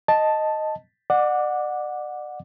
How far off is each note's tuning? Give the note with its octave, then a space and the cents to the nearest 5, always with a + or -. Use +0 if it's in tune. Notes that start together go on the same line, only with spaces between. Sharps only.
D#5 +0 A5 +0
D5 +35 F#5 -15 D6 +0